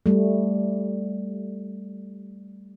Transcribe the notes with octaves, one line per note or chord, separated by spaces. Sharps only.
G3 A3